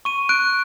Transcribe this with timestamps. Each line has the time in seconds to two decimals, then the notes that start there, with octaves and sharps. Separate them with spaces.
0.05 C#6 D#7
0.29 F#6 D7